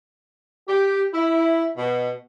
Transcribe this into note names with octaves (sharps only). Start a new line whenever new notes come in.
G4
E4
B2